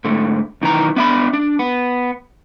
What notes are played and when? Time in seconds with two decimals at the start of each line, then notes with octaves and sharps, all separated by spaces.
0.04 G#2 D3 A3
0.61 B1 D#3 E3 A#5
0.96 B3 D4 E5 F#5 B5
1.33 D4
1.59 B3